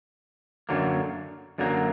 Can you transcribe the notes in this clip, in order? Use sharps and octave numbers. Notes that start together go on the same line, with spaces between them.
F#2 D3 F#3 A#3
F#2 D3 F#3 A#3